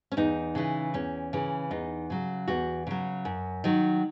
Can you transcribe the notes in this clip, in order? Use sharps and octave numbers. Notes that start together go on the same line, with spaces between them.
C#4
E2 D#4
C#3 E3
E2 C#4
C#3 E3
E2 D#4
C#3 F#3
E2 F#4
C#3 F#3
F#2
D#3 F#3